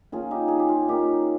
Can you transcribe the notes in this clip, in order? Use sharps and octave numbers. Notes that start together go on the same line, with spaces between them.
D#3 A#3 C#4 F4 G#4
D#4 G4
G#4
G4
F4
D#3 A#3 C#4 D#4 G4